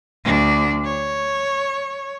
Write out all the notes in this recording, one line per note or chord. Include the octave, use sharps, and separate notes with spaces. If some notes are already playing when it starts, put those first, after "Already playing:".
D2 D4
C#5